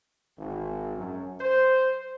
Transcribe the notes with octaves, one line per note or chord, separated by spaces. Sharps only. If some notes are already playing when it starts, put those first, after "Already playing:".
G#1
F#2
C5